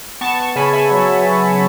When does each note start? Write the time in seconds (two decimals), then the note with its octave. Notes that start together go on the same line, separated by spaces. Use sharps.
0.21 B3 A5 C#6
0.39 A5 C#6
0.56 C#3 G#5 B5
0.73 E5 G#5
0.91 F#3
1.25 F#3